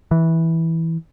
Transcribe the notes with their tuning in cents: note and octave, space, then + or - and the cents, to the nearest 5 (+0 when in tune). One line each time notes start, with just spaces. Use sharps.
E3 -10